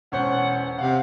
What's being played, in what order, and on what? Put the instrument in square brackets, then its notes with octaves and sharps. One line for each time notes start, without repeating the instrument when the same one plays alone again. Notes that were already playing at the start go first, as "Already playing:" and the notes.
[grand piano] E1 C#4 C5 [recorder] F#5
[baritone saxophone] C3 [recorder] F5 [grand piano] F#5